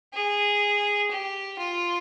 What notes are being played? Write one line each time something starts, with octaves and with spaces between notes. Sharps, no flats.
G#4
G4
F4